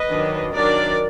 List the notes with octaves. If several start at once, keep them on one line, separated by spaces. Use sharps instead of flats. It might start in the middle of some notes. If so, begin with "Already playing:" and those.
Already playing: B4 D#5
D#3 F#3 D4
D#3 F#3 D4 A#4 D5